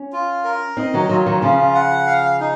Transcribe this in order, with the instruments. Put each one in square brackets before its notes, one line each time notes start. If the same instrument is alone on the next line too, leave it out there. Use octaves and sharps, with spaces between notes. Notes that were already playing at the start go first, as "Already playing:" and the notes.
Already playing: [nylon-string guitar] C#4
[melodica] F4
A#4
[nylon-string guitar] C4 D#4 [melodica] D#5
[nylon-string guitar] D#3 F#3
[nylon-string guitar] D#3 F#3 [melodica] F4
[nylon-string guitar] D#3 F#3
[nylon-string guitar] C#3 F3 [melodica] F4
[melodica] F#5
F5
D#4